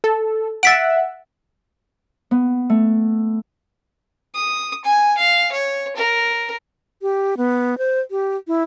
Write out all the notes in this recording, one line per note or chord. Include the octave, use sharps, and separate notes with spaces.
A4
E5 F#5 A6 B6 D7
B3
A3
D#6
G#5
F5
C#5
A#4
G4
B3
C5
G4
E4